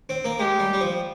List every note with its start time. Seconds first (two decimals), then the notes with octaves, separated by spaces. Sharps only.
0.09 C4
0.25 A#3
0.39 G#3 G4
0.59 G3
0.73 G3
0.81 F3